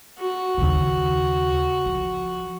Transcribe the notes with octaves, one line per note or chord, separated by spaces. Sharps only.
F#4
D#2 C#3
F3